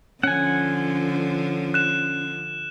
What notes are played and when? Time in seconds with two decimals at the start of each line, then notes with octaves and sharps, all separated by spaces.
0.23 D3 F3 C#4 F#5 G#5
1.74 F#6 E7